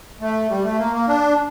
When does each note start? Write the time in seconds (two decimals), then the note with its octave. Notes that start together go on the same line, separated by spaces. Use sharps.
0.21 A3
0.50 G3
0.64 A3
0.78 A#3
0.93 A#3
1.08 D4